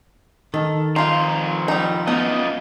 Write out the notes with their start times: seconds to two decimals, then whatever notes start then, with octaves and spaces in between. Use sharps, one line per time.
0.54 D#3 A4
0.96 F2 D#4 F4 A#5 C6
1.68 G3 D#4
2.07 F#2 B3 D#4 F4 D#5